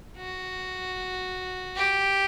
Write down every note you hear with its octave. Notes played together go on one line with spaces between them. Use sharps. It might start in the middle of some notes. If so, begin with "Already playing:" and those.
F#4
G4